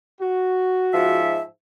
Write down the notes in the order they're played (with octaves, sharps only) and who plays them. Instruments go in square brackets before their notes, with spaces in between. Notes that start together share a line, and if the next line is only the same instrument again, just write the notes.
[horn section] F#4
[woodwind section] G#2 F3 E5